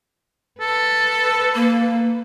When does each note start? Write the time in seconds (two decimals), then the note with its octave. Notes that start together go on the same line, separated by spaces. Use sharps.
0.60 A4 B4
1.55 A#3